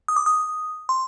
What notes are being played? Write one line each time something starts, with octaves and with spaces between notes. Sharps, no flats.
D#6
D6
D#6
C6